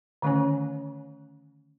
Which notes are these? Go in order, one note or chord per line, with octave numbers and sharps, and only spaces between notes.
D3 D#3 A3 C#4 C#5 G#5